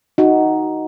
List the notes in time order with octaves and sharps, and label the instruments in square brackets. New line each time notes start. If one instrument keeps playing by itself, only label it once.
[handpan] D#4 F#4